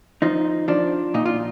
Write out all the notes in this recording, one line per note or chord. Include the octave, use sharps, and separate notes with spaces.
F3 D#4
F3 D4
A#2 D#4
F4